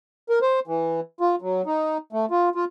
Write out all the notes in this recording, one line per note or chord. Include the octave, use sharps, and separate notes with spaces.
A#4
C5
E3
F4
F#3
D#4
A3
F4
F4